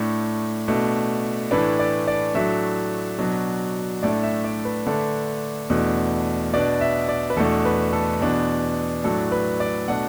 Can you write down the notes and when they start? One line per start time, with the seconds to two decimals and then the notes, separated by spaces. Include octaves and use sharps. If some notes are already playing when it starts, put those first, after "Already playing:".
Already playing: A2 A3 D4
0.68 B2 A3 D4
1.51 A2 E3 A3 D4 B4
1.79 D5
2.07 D5
2.35 A2 F#3 A3 D4 E5
3.19 B2 F#3 D4
4.03 A2 A3 D4 D5
4.23 E5
4.44 D5
4.65 B4
4.86 D3 A3 D4
5.70 E2 B2 A3 D4
6.54 B2 B3 D4 D5
6.81 E5
7.09 D5
7.30 B4
7.37 E2 B2 A3 D4 A4
7.65 B4
7.93 A4
8.21 E2 B2 B3 D4
9.04 A2 F#3 D4 A4
9.32 B4
9.60 D5
9.88 B2 A3 D4 F#5